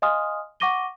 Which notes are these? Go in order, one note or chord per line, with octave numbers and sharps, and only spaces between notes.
D#5 F5 G#5 C6 D#6 F6
F#5 C#6 D6 A#6 D#7 G7